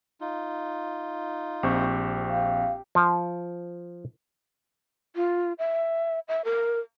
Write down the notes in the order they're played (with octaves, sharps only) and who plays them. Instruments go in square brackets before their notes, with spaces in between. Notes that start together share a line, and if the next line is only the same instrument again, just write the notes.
[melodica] D#4 F4
[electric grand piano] A#1 C4 C#6 [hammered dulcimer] G4
[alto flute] F5
[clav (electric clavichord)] F3
[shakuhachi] F4
E5
E5
A#4